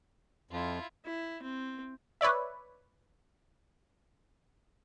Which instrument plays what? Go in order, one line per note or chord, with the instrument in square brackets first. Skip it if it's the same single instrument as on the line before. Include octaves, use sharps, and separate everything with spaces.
[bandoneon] F2 [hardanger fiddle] E4 F4
[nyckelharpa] E4
C4
[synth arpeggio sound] B4 C#5 D5 E5